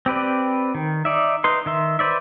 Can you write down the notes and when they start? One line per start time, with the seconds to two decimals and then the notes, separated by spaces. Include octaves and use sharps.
0.06 C4 G4 B4 D5
0.75 D#3
1.05 D#4 D5 E5
1.44 D#4 B4 C6
1.66 D#3 E5 C6
1.99 B4 C5 D5 E5